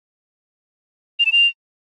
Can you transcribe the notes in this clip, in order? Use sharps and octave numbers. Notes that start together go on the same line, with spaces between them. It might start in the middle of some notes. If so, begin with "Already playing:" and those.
F7
E7
F7